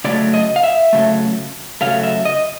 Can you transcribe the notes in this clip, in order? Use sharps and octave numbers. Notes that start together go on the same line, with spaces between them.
C#3 F#3 A3 D5
D#5
F5
E5
C#3 F#3 A3
C#3 F#3 A3 F5
E5
D#5